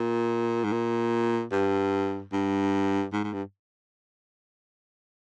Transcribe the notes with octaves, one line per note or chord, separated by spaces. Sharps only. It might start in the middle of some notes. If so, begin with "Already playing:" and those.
Already playing: A#2
G#2
A#2
G2
G2
G#2
G#2
G2